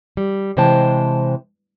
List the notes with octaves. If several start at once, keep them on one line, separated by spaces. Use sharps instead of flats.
G3
C3 E3 G#3 C5 G5 A5